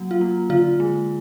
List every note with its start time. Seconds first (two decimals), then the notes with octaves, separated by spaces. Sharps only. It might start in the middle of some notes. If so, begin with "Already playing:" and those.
Already playing: F#3 A#3
0.11 F4
0.21 A#3
0.50 D3 F4
0.80 G#3